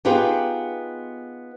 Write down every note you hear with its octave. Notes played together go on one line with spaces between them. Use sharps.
B3 D#4 F4 G4 G#4 B4